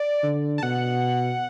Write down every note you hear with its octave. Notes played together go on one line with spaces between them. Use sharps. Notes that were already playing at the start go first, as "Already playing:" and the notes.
Already playing: D5
D3
A5
B2 F#5